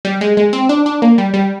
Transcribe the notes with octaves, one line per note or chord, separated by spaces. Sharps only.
G3
G#3
G#3
C4
D4
D4
A#3
G3
G3